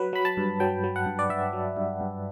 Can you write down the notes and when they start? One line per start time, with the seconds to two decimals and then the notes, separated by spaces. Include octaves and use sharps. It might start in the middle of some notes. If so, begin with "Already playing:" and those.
Already playing: F#3 B4
0.13 F#3 B5
0.25 A5
0.37 G2
0.60 F#3 G5
0.84 F#3
0.96 F#5
1.06 G2
1.19 D5
1.30 G2 E5
1.53 F#3
1.77 G2
2.01 G2